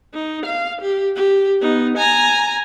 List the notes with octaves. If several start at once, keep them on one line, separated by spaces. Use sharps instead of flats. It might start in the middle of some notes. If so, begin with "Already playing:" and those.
D#4
F5
G4
G4
B3 D#4
G#5 A#5